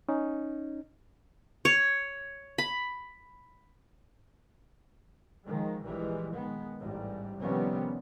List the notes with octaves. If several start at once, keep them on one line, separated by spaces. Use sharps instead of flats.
C#4 D#4
C#5
B5
D#3 F3 G#3
A#1 E3 G3 G#3
D#3 G#3 B3
A1 G#2 G3
C3 D#3 F3 G3 B3 C#4